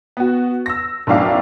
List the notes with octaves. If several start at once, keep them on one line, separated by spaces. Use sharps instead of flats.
B3 F#4
E6 A#6
B1 F#2 A2 D4 E4 F5